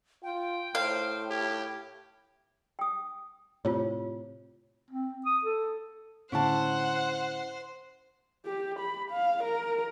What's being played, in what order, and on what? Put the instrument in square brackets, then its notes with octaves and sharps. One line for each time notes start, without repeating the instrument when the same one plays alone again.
[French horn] F4 [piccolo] G5
[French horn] A2 [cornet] C5 [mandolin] F5
[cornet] G4 [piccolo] G#6
[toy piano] G5 D#6
[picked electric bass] A2 C3 [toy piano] F4 C#5
[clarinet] C4
D#6
A4
[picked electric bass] A2 D3 [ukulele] C#4 E4 A5 [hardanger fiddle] C5 [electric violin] F#5
[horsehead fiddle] G4
B5
F5
A#4